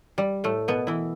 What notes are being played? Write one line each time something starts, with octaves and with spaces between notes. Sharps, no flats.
G3
A2 A3
B2 B3
E3 E4